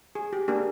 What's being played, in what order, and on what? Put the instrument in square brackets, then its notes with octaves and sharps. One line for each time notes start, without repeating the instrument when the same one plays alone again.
[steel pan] G#4
G4
A#3 D4 G4 G#4